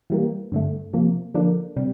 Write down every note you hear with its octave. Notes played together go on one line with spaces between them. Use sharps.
E3 G3 A#3
G2 D3 A3
C3 F3 A#3
D3 F3 A#3 D4
C3 G3